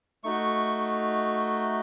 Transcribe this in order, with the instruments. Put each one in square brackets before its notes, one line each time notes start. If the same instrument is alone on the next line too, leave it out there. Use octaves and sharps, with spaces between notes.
[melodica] A3 D#4 F#4 C#6